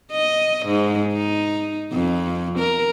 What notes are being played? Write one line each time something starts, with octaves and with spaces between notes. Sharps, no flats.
D#5
G#2
D#4
F2
A#4